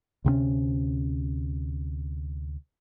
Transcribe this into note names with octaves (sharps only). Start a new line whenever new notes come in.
D2 C3 A3 C#4